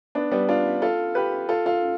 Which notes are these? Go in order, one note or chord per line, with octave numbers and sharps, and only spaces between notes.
B3 D4
G3 B3
D4 F4
F4 A4
G4 B4
F4 A4
F4 A4